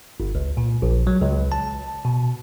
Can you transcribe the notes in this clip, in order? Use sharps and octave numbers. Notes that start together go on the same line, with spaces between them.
G1
C#2
A#2
A#1
F#3
C#2
A5
B2